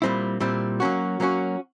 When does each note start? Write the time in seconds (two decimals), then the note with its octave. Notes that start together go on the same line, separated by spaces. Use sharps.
0.02 A#2 G3 C4 E4
0.40 A#2 G3 C4 E4
0.80 F#3 A#3 C#4 F#4
1.20 F#3 A#3 C#4 F#4